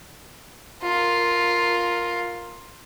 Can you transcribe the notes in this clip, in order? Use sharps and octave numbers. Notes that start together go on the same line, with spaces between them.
F4 A#4